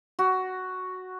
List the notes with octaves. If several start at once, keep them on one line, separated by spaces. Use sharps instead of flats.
F#4